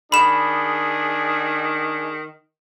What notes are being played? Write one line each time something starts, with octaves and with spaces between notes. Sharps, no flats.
D#3 D4 G#4 B5 E7